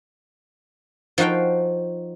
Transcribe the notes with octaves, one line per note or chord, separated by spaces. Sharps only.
F3 D#4 F#4 F5 G5